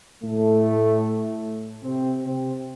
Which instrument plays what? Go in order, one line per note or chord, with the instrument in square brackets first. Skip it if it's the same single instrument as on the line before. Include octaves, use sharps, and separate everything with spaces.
[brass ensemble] A2 A3
C3 C4
C3 C4